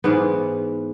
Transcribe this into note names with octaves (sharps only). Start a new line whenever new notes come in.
G#2 E3 B3